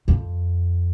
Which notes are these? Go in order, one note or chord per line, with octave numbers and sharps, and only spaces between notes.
F2